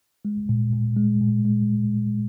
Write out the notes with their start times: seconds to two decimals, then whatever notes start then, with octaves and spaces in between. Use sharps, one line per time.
0.25 G#3
0.49 A#2
0.73 A#2
0.96 G#3
1.21 A#2
1.45 G#3